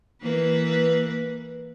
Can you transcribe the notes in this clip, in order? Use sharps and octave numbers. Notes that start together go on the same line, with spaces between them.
E3 A#3 B4